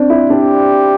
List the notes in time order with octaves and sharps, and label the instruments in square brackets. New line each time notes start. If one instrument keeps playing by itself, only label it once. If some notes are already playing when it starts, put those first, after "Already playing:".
Already playing: [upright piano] C4 D4
E4
[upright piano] D4 [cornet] G4